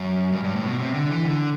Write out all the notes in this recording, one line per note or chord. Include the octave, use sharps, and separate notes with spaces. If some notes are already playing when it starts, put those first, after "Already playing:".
Already playing: F#2
G2
G2
A2
B2
C3
D3
E3
D3